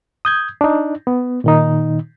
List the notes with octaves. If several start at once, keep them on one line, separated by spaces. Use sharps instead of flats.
D#6 G6 G#6
D4 D#4
B3
A#2 D#3 D#4